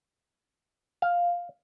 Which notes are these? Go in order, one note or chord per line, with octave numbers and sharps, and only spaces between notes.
F5